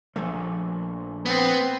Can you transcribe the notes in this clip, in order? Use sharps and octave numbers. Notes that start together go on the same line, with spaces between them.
A#1 F3 A3
B3 C4